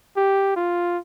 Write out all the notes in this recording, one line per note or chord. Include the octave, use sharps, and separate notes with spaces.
G4
F4